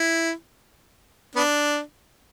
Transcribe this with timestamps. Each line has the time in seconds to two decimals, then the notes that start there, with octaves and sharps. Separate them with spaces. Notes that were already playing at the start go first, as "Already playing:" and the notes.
Already playing: E4
1.35 B3 D4